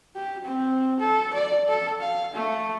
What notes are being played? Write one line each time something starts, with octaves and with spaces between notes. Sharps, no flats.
G4
C4
A4
D5
A4
F5
A3